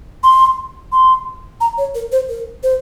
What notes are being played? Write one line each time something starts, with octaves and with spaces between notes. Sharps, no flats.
C6
C6
A#5
C#5
A#4
C5
A#4
C5